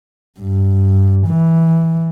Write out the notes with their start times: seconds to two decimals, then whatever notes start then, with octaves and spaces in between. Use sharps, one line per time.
0.40 G2
1.27 E3